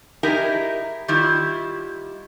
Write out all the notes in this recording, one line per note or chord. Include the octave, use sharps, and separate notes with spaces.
D#4 E4 G4 G#4 A#4
D#3 G3 E4 F4